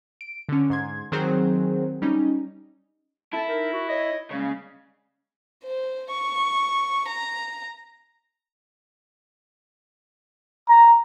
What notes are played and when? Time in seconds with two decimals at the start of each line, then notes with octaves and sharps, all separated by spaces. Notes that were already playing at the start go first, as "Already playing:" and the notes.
0.21 D7
0.49 D3 C#4
0.70 G#2 C6 G#6
1.12 D#3 F#3 C4 G#4 C5
2.02 G3 C#4 D#4
3.33 E4 A4 A5
3.48 D#4 A#4
3.72 F#4
3.89 C#5 D#5
4.31 C#3 G3 G#3 A#3
5.64 C5
6.10 C#6
7.07 A#5
10.69 A#5